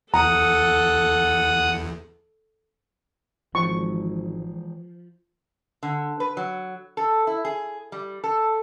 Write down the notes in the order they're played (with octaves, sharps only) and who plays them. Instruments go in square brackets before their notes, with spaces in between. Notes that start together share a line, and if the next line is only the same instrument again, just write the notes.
[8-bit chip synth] E2 [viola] A4 [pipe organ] F#5 D#6 [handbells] A#5
[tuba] G#1 [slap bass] E3 G#3 [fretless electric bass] F3 [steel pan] C#6
[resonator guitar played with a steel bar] D3
B4
F#3
A4
E4
G#4
G3
A4